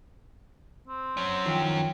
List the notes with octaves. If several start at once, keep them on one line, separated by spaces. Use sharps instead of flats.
C4
F#3 C#4
D#3 F3 G5